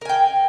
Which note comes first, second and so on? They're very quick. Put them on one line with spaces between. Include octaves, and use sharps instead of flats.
A#4 G#5 G5